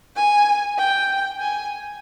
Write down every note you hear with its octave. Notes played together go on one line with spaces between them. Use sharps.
G#5
G5
G#5